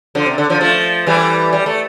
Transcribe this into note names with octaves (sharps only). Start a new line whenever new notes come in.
D3 F3
C3
D3
D3 F3
F3 A3
E3 G3
G3
A3